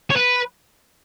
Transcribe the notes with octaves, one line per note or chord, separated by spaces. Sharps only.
C#5
B4